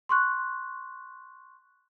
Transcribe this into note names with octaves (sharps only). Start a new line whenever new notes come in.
C6 C#6 F#6